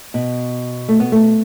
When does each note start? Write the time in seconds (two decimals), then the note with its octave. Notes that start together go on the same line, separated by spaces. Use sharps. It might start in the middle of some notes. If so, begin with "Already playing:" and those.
0.14 B2
0.89 A3
1.00 B3
1.12 A3